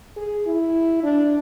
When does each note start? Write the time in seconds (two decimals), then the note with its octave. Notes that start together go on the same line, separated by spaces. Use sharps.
0.17 G#4
0.47 E4
1.03 D4